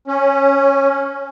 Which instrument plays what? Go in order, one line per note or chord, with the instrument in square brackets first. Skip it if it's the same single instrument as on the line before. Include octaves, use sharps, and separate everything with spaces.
[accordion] C#4